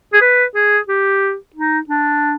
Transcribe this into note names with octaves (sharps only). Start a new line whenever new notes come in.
G#4
B4
G#4
G4
D#4
D4